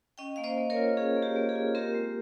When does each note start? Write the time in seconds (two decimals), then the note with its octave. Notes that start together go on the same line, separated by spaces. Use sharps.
0.18 C#4 D#5 G5
0.36 A#3 F5
0.44 C5 D#5
0.58 A#3
0.70 A#4 C#5
0.76 F4
0.97 C#4 G#4
1.17 A#3
1.22 G4
1.36 A#3
1.49 G#4
1.55 F4
1.75 C4 G4 A#4
1.94 G#3